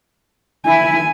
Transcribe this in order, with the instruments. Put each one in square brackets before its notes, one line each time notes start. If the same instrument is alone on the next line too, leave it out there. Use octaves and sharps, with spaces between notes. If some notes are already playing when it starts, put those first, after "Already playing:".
[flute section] E4 [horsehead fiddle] G#5